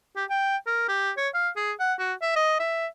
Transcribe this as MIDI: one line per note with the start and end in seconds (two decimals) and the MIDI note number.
0.16 0.25 67
0.30 0.57 79
0.67 0.88 70
0.89 1.11 67
1.17 1.29 73
1.34 1.49 77
1.57 1.72 68
1.80 1.93 78
1.99 2.13 66
2.22 2.33 76
2.36 2.58 75
2.60 2.87 76